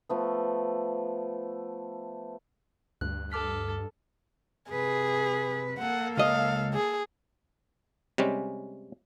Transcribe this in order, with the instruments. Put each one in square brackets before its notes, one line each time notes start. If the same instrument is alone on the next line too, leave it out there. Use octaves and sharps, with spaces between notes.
[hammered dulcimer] F3 A3 B3
[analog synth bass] D2 [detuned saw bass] G2 [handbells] F#6
[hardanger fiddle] A4 [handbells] D6 F6 B6
[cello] C3 B4 [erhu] G#4
[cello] A#3 A4 [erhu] F#5
[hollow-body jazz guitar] C#2 D#5 [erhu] F5
[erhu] G#4
[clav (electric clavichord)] C3 G3 G#3 C#4